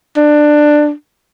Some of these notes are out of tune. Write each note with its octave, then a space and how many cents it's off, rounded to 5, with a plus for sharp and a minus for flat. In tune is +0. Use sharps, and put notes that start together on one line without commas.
D4 +15